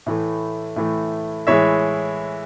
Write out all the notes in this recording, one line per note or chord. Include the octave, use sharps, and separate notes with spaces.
A2 E3 A3
A2 E3 A3
A2 E3 G#3 C#5 E5